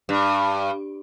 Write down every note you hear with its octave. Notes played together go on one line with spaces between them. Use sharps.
G2